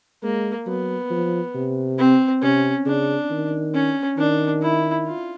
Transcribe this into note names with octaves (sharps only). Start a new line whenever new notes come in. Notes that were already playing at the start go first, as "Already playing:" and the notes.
G#3 A#3
F#3 B3
F3
C3
C4
C3 C#4
C#3 D4
D#3
C#4
D#3 D4
E4
F4